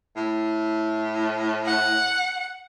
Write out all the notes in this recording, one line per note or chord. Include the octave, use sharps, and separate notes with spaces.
A2
F#5